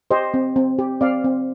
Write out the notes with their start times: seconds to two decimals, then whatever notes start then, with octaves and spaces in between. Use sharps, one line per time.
0.11 G4 C5 D#5
0.34 C4
0.56 C4
0.79 G4
1.01 C4 D5 F5
1.24 C4